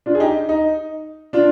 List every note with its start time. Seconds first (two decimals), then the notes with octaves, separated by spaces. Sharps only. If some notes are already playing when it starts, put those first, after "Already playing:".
0.06 D4 F4
0.15 G#4
0.20 D#4 G4
0.49 D#4
1.33 D4 F4